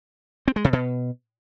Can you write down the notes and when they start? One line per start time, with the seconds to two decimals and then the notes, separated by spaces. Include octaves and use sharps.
0.48 C4
0.56 G#3
0.64 C3
0.73 B2